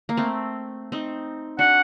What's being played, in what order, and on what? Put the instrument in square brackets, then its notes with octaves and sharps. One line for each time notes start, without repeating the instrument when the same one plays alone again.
[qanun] A#3
A3 C4
C4 D#4
[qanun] D4 F#4 [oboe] F#5